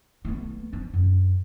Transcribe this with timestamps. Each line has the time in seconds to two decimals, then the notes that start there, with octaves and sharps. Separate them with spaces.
0.25 A3 B3
0.73 F3 D4
0.94 F#2